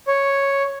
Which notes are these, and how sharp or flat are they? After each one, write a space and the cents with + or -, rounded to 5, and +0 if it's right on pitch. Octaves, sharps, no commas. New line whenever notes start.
C#5 +0